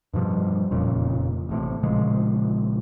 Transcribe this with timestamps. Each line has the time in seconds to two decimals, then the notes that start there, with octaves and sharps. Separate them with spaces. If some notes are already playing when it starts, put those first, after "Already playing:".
0.13 G2 B2 F3 G3
0.71 E1 F2 A#2 C#3
1.49 A1 A2 C3
1.83 A#1 C#3 F3 G#3